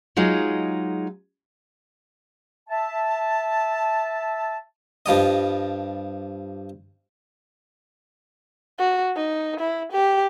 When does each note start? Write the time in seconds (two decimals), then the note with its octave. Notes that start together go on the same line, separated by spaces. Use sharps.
0.17 F#3 G#3 D#4 F4 G#4
2.69 E5 A5
5.06 G2 F3 G3 D#5
8.79 F#4
9.17 D#4
9.60 E4
9.92 G4